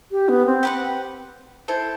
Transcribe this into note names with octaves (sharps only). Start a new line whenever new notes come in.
G4
B3
C4
G4 B4 F#5
E4 A4 C5